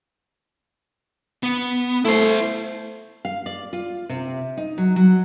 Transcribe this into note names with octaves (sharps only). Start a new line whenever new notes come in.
B3
A3 E4 C5
F5
D5
F4
C3
D#4
F#3
F#3